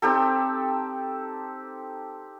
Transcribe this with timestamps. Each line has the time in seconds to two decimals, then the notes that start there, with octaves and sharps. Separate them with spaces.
0.02 C4 D#4 G4 A4